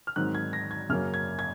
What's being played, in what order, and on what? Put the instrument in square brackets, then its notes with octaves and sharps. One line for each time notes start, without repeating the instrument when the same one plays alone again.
[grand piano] F6
G#2 D#3 F#3 C4 F#6
G#6
A#6
G#6
F#2 C#3 F#3 A#3 C#4 F6
G#6
G#6